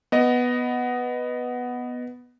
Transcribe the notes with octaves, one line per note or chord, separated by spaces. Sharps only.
B3 D#5